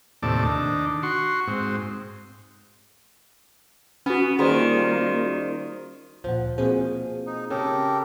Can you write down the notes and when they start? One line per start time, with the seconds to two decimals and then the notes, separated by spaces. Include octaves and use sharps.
0.23 D#2 A2 C3 D5 A5
0.45 D#3 D4
1.03 F#4 C6 C#6
1.47 G#2 C4
4.06 B3 C#4 F#4
4.39 D#3 G3 A#3 F4 G#4 C5 D5
6.24 D2 A#2 F3 F#5
6.58 B2 F3 A#3 C4 G#4
7.27 D#4
7.50 C#3 G4 A4 A#4